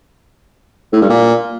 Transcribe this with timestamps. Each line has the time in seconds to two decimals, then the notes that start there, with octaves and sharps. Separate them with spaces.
0.93 A2
1.01 G2
1.10 A#2